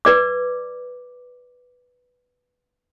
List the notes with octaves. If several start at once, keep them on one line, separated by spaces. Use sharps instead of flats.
B4 D5 D6